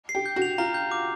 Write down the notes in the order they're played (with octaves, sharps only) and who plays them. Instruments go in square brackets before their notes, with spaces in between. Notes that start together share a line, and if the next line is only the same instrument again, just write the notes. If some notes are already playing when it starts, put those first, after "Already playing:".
[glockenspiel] C7
[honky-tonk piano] G4
[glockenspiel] G6
[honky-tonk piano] F#4
[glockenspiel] F7
[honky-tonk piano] F4 [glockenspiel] A#5
[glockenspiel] G6
D6